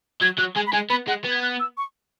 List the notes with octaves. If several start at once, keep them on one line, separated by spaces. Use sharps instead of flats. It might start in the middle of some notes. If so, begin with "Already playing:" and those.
F#3 G#6
F#3 F#6
G#3 G#5
B5
G#3 G#5
B3 B5
G#3 F#5
B3
G#6
F#6
E6
C#6